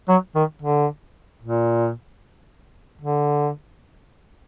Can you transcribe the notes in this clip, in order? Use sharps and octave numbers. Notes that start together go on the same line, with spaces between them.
F#3
D#3
D3
A#2
D3